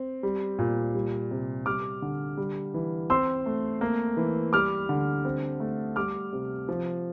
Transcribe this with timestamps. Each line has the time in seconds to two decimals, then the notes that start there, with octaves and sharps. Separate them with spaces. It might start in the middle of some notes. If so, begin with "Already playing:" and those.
Already playing: C4
0.23 G3
0.59 A#2
0.95 G3
1.31 C3
1.66 G3 D6 F6
2.02 D3
2.37 G3
2.74 E3
3.10 C4 C6 E6
3.46 A3
3.81 A#3
4.17 E3
4.53 G3 D6 F6
4.89 D3
5.25 C4
5.60 A3
5.96 G3 D6 F6
6.33 C3
6.69 F3